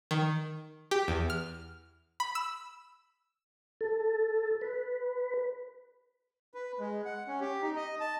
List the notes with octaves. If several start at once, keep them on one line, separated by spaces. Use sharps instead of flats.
D#3
G4
E2
F6
B5
E6
A4
B4
B4
G#3
F#5
C#4
G4
D#4
D#5
A5